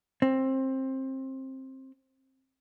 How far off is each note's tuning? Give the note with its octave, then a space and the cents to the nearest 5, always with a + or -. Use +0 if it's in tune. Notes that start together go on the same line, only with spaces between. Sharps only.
C4 +20